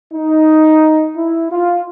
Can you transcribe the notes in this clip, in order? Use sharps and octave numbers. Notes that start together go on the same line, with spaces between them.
D#4
E4
F4